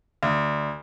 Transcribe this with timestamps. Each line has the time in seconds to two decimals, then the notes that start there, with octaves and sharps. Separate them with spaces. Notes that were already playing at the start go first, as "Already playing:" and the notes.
0.23 D2